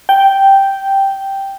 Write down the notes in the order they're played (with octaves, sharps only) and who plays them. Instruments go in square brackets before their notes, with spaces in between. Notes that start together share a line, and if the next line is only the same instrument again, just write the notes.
[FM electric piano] G5